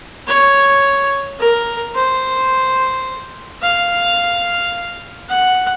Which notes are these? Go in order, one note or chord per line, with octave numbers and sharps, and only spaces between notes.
C#5
A#4
C5
F5
F#5